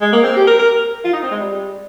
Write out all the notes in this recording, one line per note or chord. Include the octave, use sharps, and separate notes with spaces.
G#3
A#3
C4
G4
A#4
A#4
F4
D#4
C4
G#3
G3